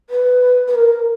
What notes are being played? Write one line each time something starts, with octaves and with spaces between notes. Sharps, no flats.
B4
B4
A#4